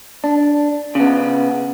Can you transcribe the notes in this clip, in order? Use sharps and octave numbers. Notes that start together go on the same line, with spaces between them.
D4
C#3 B3